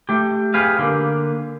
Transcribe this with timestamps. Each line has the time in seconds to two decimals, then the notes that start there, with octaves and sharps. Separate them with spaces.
0.09 A3 G4
0.54 G4 G#4 B4 F5
0.79 D3 A#3